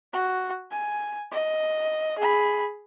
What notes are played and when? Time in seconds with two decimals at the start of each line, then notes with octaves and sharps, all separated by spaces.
0.13 F#4
0.71 G#5
1.32 D#5
2.18 G#4 B5